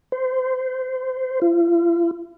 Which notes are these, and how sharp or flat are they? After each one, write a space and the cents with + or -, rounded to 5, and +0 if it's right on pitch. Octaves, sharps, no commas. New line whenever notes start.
C5 -25
F4 -45